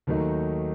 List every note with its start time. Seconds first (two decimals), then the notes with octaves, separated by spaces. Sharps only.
0.07 D#2 D#3 F#3 A3 D#4